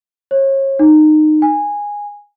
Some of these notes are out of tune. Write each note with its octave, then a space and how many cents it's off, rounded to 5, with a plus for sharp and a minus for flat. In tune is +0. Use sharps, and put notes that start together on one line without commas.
C#5 -35
D#4 -20
G#5 -10